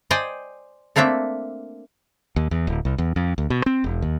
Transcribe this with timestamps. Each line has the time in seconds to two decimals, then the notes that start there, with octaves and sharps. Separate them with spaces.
0.11 C5 D5 D#5 G5 G#5
0.96 A3 A#3 C4 D4 E5
2.36 D#2
2.51 E2
2.67 D1
2.85 C2
2.98 E2
3.16 F2
3.38 D2
3.50 B2
3.66 C4
3.84 E1
4.02 D#2